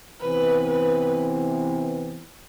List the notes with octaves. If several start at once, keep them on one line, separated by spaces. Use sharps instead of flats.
C3 E3 B3 B4
B4